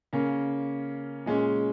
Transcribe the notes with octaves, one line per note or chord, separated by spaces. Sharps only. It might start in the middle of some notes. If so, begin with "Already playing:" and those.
C#3 A#3 C#4
A#2 G#3 C#4